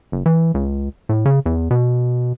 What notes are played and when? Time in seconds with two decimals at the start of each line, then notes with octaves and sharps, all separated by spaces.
0.12 F#1
0.26 E3
0.54 C#2
1.09 A2
1.25 C#3
1.46 E2
1.71 B2